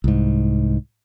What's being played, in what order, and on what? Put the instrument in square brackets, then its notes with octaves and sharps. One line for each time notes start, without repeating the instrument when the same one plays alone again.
[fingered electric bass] C2 G#2